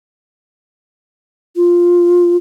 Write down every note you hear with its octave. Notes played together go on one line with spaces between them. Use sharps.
F4